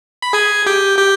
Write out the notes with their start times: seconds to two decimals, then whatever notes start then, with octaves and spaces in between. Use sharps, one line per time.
0.22 B5
0.33 G#4 G#5
0.66 G4 G5
0.99 G4 G5